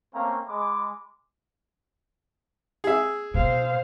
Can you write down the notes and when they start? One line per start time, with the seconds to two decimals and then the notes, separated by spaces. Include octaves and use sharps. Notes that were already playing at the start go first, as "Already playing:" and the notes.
0.13 A3 A#3 C4 C#4 F5 A#5
0.47 G#3 B5 D6
2.84 G#4 E5
3.34 B2 C5 F5